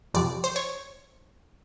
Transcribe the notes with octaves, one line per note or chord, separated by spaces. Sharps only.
F2 C3 F3 D5
C5
C#5